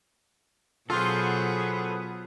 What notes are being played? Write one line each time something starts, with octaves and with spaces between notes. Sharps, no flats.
B2 F#3 B3 F4 G#4 A4 C5